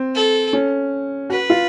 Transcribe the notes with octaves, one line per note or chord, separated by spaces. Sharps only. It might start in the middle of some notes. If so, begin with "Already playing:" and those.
Already playing: C4
A4
C#4
F#4 B4
F4